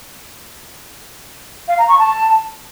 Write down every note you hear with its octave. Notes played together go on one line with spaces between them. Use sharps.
F5
A#5
C#6
A5